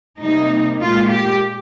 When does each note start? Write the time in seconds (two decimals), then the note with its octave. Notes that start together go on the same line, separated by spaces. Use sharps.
0.20 C3 G3 A#3 D#4
0.82 A#2 G#3 F4
1.11 G4